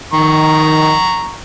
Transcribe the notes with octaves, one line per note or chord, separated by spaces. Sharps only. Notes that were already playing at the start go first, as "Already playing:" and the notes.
D#3 A#5 C#6